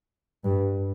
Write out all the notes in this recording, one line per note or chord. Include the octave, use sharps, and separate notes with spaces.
G2